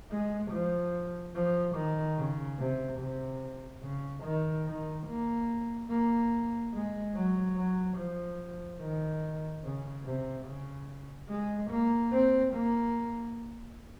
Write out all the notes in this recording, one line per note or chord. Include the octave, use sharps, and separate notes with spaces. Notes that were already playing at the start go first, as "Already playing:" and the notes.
G#3
F3
F3
D#3
C#3
C3
C3
C#3
D#3
D#3
A#3
A#3
G#3
F#3
F#3
F3
D#3
C#3
C3
C#3
G#3
A#3
C4
A#3